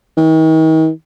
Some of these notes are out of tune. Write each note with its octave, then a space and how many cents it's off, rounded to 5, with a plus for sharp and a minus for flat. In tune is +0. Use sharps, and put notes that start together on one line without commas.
D#3 +40